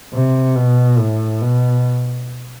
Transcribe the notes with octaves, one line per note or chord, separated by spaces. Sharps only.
C3
B2
A2
B2